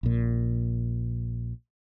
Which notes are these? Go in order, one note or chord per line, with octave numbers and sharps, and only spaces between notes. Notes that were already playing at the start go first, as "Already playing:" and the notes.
A#1 A#2